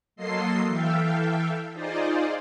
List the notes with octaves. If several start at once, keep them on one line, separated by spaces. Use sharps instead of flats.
F#3 A#3 A4 D#5 C6 C7
E3 A4 E5 F5 G5
D#4 F4 G#4 C5 D5 D#5